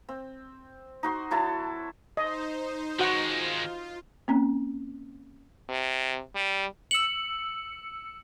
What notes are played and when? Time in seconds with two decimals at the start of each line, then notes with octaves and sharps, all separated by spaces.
0.09 C4
1.03 D#4 F#4 C6
1.31 F#3 E4 A4 A5
2.17 D#4 C5 D#5
2.99 D#3 G#3 F#4 F#5
3.28 F4
4.28 A#3 C4 C#4
5.69 C3
6.35 G3
6.91 E6 C#7 F#7